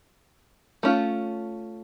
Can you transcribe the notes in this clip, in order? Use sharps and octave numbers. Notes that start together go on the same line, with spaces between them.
A3 C#4 F4